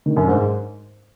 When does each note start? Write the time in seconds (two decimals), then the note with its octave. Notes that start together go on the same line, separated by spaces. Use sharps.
0.06 D#3
0.16 F#2
0.28 G#2